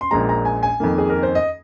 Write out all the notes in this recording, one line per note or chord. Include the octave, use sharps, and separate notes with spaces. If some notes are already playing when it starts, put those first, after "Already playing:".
C6
A#1 A#2 G#3 A#5
A#5
G#5
G#5
F2 D#3 A#3
G#4
A#4
C5
D#5